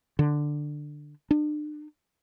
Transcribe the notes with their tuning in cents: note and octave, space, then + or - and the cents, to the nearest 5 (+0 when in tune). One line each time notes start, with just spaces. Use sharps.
D3 +10
D4 +40